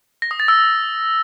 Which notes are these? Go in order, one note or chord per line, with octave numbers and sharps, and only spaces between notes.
A#6
D#6
A6
E6